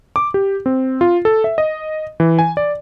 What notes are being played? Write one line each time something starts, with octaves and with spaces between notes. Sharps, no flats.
D6
G4
C4
F4
A4
E5
D#5
E3
G#5
D5